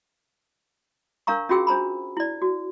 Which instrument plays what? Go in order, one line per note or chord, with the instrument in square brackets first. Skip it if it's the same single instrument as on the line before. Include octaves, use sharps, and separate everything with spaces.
[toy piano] D4 A#4 F5 A#5 C#6
C#4 F4 F#4 G#4 G5 E6
D4 C5 A#5 B5
E4 D5
F#4